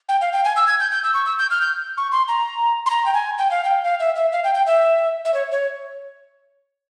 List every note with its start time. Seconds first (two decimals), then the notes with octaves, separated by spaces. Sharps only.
0.09 G5
0.21 F5
0.33 G5
0.45 G#5
0.56 E6
0.67 G#6
0.80 G6
0.91 G6
1.03 E6
1.14 C#6
1.26 E6
1.38 G6
1.50 F6
1.61 G6
1.97 C#6
2.12 C6
2.28 A#5
2.86 C6
2.90 A#5
3.06 G5
3.14 G#5
3.38 G5
3.51 F5
3.64 G5
3.84 F5
4.00 E5
4.16 E5
4.32 F5
4.44 G5
4.54 G5
4.67 E5
5.25 E5
5.34 C#5
5.51 C#5